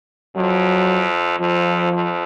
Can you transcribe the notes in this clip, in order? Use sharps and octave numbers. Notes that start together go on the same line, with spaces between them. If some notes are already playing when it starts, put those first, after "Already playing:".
F2 F#3
F2 F3
F2